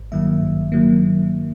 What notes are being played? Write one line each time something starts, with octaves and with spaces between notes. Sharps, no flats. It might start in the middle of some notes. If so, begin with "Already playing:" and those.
Already playing: G#1
G2 D#3 F#3 A#3 E5
G#1
G2 D#3 F#3 A#3